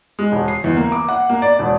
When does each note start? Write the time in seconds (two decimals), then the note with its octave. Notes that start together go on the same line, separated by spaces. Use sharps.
0.19 G#3
0.32 E1
0.48 C7
0.64 E2
0.77 A#3
0.92 D6
1.09 F#5
1.29 A#3
1.42 D5
1.59 E1